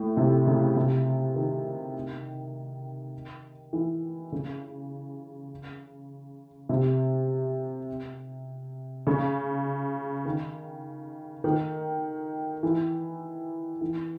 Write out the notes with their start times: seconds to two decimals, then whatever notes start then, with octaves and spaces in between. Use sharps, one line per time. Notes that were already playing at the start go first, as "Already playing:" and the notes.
Already playing: A2
0.17 C3
0.47 C#3
0.76 C3
1.36 D#3
3.73 E3
4.32 C#3
6.69 C3
9.07 C#3
10.25 D#3
11.44 D#3
12.63 E3
13.81 E3